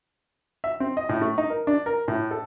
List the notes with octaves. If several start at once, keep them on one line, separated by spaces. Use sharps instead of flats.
E5
C4
D#5
A2
A3
D#4
A#4
D4
A#4
A2
A4